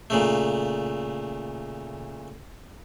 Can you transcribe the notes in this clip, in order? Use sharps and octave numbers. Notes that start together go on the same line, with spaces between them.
A#2 C#3 A3